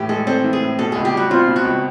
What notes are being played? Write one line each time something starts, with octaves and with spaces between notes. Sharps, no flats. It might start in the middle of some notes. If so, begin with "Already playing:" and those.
Already playing: A2 E3 G4
G#3 A4
C4 A4
E3
G#4
A2
B2 A4
C#2 G#4
G4
G3 F#4
C4 F4
B2
F#4
C#2